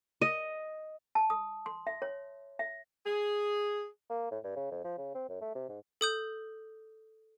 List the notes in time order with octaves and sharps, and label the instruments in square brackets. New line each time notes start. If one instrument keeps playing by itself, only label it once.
[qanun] D#5
[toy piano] A5
D#6
C6
E5
C#5
E5
[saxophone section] G#4
[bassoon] A#3
A2
G2
C#3
F2
F3
C#3
C4
F#2
A3
C3
G#2
[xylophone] A4 D#6 G6